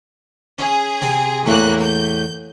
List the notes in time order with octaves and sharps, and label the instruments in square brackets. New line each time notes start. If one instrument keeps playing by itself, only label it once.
[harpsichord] C#4 [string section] G#4
[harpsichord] C3 C4 G#5
[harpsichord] E2 A2 A3 [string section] E3 A#3 F#6
[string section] G6